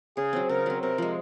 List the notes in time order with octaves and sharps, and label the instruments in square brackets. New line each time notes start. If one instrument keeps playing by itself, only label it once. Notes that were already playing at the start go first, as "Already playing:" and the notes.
[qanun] C#3 [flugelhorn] G#4
[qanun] F#3 C4
[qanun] C#3 [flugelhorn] A#4
[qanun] F#3 C4
[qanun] C3 [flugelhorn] A#4
[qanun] F3 G#3